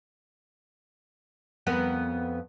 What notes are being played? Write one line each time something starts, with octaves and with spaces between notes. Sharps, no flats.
F2 B3 A#4